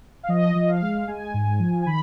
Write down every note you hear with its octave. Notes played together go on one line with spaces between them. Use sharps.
F5
F3 D#5
F3
F5
G#3
G#3 G#5
G#2
F3
G#5
D#3 B5